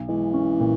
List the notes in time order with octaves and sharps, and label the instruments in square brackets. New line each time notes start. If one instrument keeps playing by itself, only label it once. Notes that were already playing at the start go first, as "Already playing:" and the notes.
Already playing: [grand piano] B1
[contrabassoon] E3 [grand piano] G#3
[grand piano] C#4
A#2